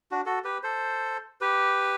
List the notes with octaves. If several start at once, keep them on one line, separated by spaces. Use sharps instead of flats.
D4 F#4
F#4 A4
G4 B4
A4 C5
G4 B4